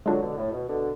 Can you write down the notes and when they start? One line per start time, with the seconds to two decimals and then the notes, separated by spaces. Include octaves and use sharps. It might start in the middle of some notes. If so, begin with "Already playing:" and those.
0.06 D3 F#3 G#3 D4 F4
0.21 B2 D3
0.38 A2
0.52 B2
0.68 B2 D3